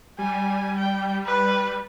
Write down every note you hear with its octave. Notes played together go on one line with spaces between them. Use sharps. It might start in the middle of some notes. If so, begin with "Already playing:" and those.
G3 G#5
G5
B4